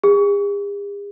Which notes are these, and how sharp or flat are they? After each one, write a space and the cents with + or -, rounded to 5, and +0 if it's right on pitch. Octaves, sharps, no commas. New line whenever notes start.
G#4 -45